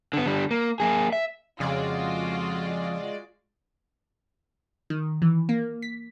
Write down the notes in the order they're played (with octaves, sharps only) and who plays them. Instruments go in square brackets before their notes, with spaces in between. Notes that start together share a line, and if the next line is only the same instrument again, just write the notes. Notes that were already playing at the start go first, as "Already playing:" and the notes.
[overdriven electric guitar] D3 B3
D3 G3
A#3
A#3 G#4
E5
[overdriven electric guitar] F2 [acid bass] C#3 [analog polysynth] G#3 D5 [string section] F4 F#4
[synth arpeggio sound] D#3
E3
A#3
B6